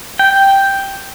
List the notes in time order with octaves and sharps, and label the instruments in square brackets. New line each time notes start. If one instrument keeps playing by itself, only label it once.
[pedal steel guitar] G5